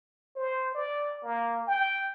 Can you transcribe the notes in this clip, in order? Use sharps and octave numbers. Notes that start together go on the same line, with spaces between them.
C5
D5
A#3
G5